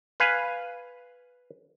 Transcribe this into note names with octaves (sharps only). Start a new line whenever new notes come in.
B4 F5 G#5